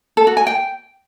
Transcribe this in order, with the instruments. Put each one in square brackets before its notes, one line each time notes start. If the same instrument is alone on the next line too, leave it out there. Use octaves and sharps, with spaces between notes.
[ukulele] A4
F#4
G#5
G5